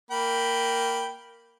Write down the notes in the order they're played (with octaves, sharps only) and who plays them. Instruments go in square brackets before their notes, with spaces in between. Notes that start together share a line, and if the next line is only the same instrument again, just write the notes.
[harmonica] A#3 G5 B5